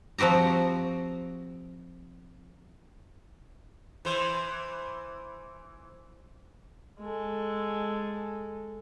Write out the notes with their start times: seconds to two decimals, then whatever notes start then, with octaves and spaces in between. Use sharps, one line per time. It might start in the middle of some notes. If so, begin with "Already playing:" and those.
0.18 F3 C4 F#4 G4 A#5
4.05 E3 C5
7.00 G#3 A4